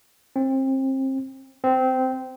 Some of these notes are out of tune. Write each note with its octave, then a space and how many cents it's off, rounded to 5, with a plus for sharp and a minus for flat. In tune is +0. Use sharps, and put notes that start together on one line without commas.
C4 +30
C4 -15